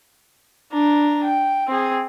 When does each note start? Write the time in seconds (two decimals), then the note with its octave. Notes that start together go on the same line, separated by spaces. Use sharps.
0.72 D4 A#5
1.24 G5
1.68 C4 G#4